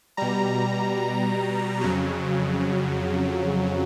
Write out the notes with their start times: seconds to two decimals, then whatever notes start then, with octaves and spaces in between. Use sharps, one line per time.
0.17 B2 G3 A#5
1.81 F2 C#3 F#3